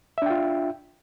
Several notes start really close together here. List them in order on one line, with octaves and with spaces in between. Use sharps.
E5 D4 G5 F4